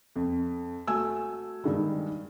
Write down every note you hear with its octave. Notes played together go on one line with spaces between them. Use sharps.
F2
A3 F#4 G#5 E6
G2 D#3 G#3